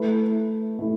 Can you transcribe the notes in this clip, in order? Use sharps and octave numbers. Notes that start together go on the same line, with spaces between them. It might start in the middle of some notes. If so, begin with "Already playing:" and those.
Already playing: A3 E4 B4
A3 E4